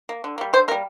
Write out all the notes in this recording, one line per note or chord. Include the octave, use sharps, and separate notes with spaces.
A#3
D3
G3 A#3
D3 C5
G3 A#3 A#4